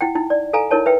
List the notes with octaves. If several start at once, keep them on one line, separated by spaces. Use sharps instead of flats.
E4 F#5 G5
D#4 E4
D5
A4 F5 G#5 A#5
D#4 E4 A#4 C#5 A5
B4 E5 G5